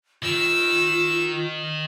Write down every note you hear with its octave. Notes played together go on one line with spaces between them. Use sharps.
D#3 F4 E6